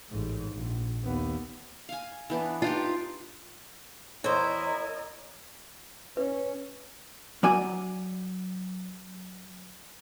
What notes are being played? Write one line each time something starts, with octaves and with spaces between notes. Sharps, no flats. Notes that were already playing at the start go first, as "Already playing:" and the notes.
A1 G#2
A#1
D#2 B3
F5 G#5
E3 B3 D4
D4 D#4 F4 G4
E2 E4 A#4 C5 C#5 D#5
C#4 B4
F#3 D5 G#5